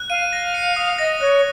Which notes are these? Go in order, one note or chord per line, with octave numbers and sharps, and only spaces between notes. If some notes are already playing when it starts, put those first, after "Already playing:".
Already playing: F#6
F5 D#7
A#6
C#7
D#6
D#5 A#6
C#5 F#6